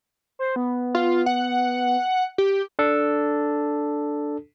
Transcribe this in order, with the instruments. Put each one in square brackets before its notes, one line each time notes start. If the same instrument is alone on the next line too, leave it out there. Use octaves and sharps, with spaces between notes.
[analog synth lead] C5
B3
[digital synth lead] F4
F#5
G4
[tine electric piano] D4 A4